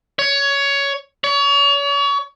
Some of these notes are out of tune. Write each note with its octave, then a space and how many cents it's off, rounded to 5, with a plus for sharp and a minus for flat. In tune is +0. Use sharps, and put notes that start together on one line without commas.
C#5 +15
C#5 +35